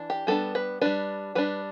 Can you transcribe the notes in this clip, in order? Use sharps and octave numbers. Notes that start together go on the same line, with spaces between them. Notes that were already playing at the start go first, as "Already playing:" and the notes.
Already playing: E3 D4
G4
G3 B3 D4 A4
B4
G3 D4 B4
G3 D4 B4